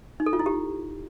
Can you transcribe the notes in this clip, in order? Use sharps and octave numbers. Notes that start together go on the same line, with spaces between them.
D#4
A4
F4
E4
G4